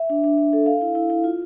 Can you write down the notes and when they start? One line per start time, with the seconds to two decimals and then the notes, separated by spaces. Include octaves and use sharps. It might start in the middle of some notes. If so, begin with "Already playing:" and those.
Already playing: E5
0.10 D4
0.24 D4
0.38 D4
0.53 A4
0.66 F5
0.81 E4
0.95 E4
1.10 E4
1.24 F4